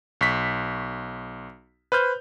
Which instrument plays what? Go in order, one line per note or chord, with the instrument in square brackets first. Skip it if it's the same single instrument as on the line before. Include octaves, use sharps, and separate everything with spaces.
[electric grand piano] B1 C#6 B6
B4 C5 F6 G6